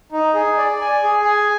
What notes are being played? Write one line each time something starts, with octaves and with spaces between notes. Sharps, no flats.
D#4
G#4
D5
G#5
G#4
G#5